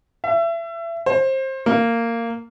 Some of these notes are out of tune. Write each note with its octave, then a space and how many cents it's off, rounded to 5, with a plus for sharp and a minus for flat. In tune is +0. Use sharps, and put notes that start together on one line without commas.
E5 +30
C5 +25
A#3 -15